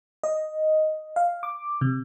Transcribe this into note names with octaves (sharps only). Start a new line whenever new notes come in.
D#5
F5
D6
C3